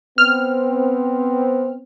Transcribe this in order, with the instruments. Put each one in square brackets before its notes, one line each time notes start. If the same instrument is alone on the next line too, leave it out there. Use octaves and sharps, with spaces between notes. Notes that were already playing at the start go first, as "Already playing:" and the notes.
[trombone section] B3 C4 [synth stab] F6